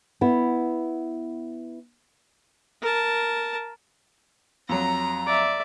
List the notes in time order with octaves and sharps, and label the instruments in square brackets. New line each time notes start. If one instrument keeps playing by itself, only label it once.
[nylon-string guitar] B3 E4
[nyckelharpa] A#4 A5
[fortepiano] F2 F#3 [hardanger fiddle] A#5
[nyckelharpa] D5 E5